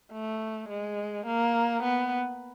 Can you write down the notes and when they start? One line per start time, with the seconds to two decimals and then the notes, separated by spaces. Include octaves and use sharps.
0.12 A3
0.69 G#3
1.27 A#3
1.83 B3